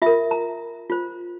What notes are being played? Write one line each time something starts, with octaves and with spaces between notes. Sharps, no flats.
F4 A#4 E5
A#5
F4 C5